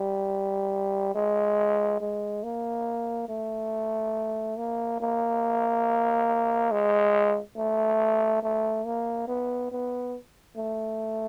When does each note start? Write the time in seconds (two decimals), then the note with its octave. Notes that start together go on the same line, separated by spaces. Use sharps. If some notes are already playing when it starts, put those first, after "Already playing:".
Already playing: G3
1.15 G#3
2.01 G#3
2.43 A#3
3.29 A3
4.57 A#3
5.01 A#3
6.72 G#3
7.57 A3
8.43 A3
8.86 A#3
9.28 B3
9.72 B3
10.57 A3